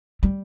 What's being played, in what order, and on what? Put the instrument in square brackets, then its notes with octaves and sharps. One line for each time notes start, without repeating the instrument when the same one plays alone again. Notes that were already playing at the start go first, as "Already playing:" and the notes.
[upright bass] G3